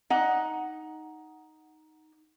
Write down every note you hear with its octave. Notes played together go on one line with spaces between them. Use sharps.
D#4 F#5